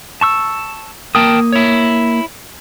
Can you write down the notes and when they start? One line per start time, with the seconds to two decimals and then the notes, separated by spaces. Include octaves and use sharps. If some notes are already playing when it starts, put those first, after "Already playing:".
0.21 A5 C#6 E6
1.15 A#3 A#4 G5 A5 D#6
1.52 E4 C#5